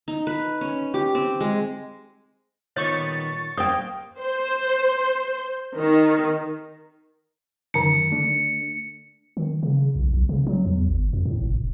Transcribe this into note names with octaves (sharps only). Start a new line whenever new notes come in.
D#4
B4
C#4
G4
C4
G#3
A#2 D#3 B3 C#5 C#6 A6
A#3 C5 G5 D#6
C5
D#3
F#2 D3 D#3 A5 C#7
A3 D4
D#3
C#3
B1
B1
C#3
F#3
E2
G1
F2
A2
F#1
F1